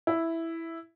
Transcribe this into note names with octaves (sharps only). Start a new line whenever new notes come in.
E4